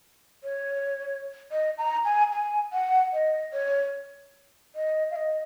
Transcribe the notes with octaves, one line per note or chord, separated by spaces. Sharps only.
C#5
D#5
A#5
G#5
G#5
F#5
D#5
C#5
D#5
F5
D#5